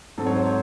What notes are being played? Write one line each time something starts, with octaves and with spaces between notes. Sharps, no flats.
G#2 F#3 C4 A4
C#5
C5
C#5